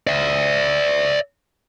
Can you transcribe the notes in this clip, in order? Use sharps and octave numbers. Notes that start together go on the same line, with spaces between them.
D5 E5